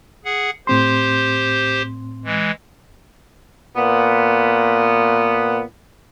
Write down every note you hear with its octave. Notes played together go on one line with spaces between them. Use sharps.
G#4 F#5
A2 C4 G4 C5 C6
E3 G#3
A#2 B3